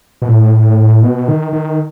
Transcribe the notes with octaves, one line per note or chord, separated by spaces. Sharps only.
B2
A2
B2
D#3
D#3